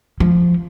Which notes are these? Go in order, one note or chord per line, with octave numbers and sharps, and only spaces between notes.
F3